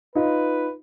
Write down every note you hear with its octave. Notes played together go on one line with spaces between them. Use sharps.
D#4 F4 B4